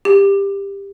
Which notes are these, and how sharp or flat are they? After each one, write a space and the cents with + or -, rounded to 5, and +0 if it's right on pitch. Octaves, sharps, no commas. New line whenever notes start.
G4 +20